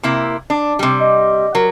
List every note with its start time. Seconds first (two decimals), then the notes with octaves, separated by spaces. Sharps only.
0.03 C3 A#3 E4
0.50 D4
0.79 C3 G3
1.00 D#5
1.55 F#3 A#4